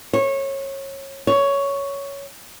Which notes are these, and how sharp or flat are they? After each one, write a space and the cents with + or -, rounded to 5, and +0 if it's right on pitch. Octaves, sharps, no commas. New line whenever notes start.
C#5 -25
C#5 +10